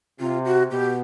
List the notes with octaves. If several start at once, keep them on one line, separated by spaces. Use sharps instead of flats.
C3 F4
F#4
B2 G4